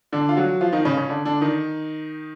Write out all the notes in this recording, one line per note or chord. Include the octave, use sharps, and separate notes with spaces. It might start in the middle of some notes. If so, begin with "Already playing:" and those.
D3 D4
F4
F#3 F#4
F3 F4
D#3 D#4
C#3 C#4
C#3 C#4
D3 D4
D3 D4
D#3 D#4